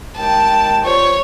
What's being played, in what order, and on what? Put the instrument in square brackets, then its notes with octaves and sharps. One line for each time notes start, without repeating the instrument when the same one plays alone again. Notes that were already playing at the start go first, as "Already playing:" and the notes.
[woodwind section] D#2 G#3 G5 [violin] A5
[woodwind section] G3 F4 C5 [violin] C#5